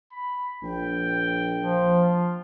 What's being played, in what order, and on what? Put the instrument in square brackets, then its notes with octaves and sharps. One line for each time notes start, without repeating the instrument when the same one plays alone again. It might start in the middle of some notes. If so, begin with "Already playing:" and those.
[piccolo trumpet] B5
[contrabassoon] A#1 [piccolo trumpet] G5
[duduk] F3
[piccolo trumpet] F4